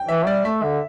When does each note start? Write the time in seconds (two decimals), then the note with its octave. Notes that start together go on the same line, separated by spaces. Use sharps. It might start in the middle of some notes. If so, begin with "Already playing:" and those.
Already playing: G5
0.08 E3 E5
0.26 G3 D5
0.45 A3 E5
0.63 D3